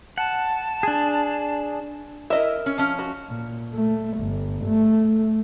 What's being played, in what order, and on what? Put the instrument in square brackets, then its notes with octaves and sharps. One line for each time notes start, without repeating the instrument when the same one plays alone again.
[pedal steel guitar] F#5 [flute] A5
[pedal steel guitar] D4 G#4
[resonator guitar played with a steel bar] E4 E5 [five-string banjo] A#4 D#5
[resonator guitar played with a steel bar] C#4
F3 C#4
[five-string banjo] F#4
[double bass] A#2
A3
G1
A3